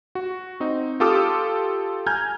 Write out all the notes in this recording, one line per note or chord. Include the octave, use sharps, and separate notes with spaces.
F#4
C4 D#4
F4 G4 A4 D6 D#6 F6
G#5 A#5 F6 G6 G#6